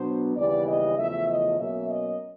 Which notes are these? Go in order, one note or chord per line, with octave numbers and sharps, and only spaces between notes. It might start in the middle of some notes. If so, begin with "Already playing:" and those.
Already playing: B2 F#3 B3 D4 C5
D#2 C#3 E3 G3 B3 D5
D#5
E2 C#3 F3 A3 E5
D#5
B2 F#3 A#3 C#4 E5
D#5